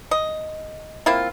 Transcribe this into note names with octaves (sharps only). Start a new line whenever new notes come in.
D#5
A#3 C4 E4 F4